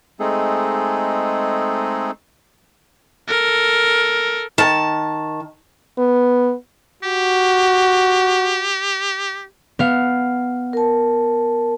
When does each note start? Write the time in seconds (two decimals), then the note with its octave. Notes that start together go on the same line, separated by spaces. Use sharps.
0.20 G#3 A3 C4 D#4 G#4 A4
3.28 A4 A#4
4.58 D#3 A5
5.98 B3
7.03 F#4 G4
9.79 B3 F5
10.73 A#4 A5